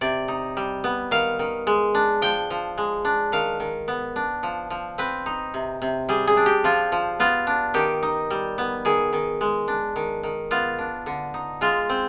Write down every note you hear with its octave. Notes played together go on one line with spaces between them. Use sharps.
C3 D5
D#4
G3
B3
D#3 F5
D#3
G#3
D4
F3 G5
F3
G#3
D4
D#3 F5
D#3
B3
D4
F3
F3
C4 B4
D#4
C3
C3
G3 G#4
G#4
D4
G4
F3 F4
F3
B3 F4
D4
D#3 G4
D#4
G3
B3
D#3 G#4
D#3
G#3
D4
D#3
D#3
B3 F4
D4
D3
D#4
G#3 F4
C4